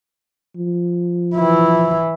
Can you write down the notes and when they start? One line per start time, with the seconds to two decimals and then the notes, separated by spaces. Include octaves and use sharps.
0.57 F3
1.35 E3 E4